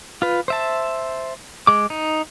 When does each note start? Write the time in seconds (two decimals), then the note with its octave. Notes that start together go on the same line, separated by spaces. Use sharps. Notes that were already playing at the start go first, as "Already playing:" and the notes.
0.22 F4 B4
0.48 C5 E5 A5
1.67 G#3 D6
1.90 D#4